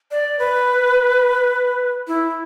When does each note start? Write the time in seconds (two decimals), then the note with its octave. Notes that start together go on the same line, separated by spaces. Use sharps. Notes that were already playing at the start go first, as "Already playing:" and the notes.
0.11 D5
0.39 B4
2.08 E4